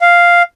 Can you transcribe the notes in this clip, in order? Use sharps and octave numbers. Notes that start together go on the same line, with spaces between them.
F5